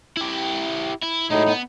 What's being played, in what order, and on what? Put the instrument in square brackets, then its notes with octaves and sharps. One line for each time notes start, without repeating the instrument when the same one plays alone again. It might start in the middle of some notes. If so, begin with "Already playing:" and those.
[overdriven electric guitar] E4 G4
E4
[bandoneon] A2 D#4 [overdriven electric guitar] F#3 G#3
[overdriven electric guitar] B3